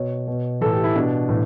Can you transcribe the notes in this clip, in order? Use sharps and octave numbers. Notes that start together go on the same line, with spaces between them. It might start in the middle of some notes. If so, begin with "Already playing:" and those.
Already playing: B2 C#5
B2
A2 E3 A4
G4
E4
B2 D4
A2 E3